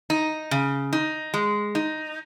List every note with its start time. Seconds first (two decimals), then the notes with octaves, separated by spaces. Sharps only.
0.10 D#4
0.51 C#3
0.93 D#4
1.34 G#3
1.75 D#4